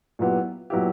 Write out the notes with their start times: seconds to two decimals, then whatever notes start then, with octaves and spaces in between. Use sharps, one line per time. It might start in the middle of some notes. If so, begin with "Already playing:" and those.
0.19 A#2 F#3 B3 E4 G4
0.70 A#2 F#3 B3 E4 G4